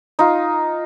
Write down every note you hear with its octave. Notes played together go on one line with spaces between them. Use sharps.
D#4 F4